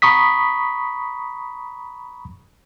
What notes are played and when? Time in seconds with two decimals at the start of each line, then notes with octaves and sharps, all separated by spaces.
0.02 A#5 B5 C#6 D#6 B6